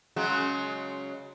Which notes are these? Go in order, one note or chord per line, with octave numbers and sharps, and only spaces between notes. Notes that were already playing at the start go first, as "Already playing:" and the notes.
C#3 F#3 G#3